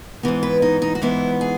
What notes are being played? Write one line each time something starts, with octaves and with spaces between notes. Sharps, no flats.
G#2 E3 B3
B4
D#4
D#4
F#4
G#2 E3 B3 E4
G#4